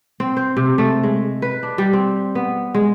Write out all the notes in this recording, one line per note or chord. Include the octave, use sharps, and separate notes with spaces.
C4
C5
C3
A3
G#3
B4
D4
G3
C4
B3
G#3